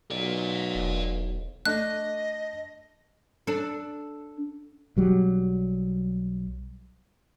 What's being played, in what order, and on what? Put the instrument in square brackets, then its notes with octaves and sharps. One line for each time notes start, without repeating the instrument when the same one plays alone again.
[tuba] B1 [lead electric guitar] A#4 D5
[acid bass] E1
[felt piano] A3 D4 [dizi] D#5 [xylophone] F#6
[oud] D4 A4
[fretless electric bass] B1 F#3 G3